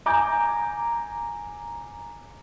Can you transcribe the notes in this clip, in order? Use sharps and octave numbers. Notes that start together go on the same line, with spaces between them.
G#5 A#5 D6 G6